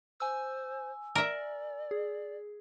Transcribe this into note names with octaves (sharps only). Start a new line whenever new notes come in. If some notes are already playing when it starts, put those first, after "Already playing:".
C5 G#5 E6
A#4 D5 E5
G#4